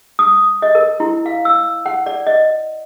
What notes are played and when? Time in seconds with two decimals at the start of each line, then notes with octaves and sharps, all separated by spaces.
0.19 D#6
0.62 D#5
0.75 A#4
1.00 E4
1.26 F5
1.45 E6
1.86 F#5
2.06 D5
2.27 D#5